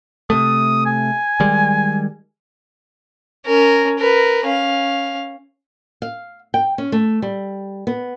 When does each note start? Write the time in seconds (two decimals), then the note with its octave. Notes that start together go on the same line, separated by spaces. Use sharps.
0.30 C3 A3 D#6
0.86 G#5
1.40 D#3 G3 G#3
3.46 C#4 A#4
3.99 A#4 B4
4.45 C#4 F5
6.02 F5
6.54 G5
6.78 C#4
6.92 A3
7.22 G3
7.87 B3